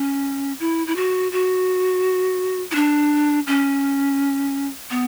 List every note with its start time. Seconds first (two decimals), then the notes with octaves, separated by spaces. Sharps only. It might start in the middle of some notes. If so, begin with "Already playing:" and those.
Already playing: C#4
0.60 E4
0.87 E4
0.96 F#4
1.32 F#4
2.71 E4
2.75 D4
3.47 C#4
4.90 B3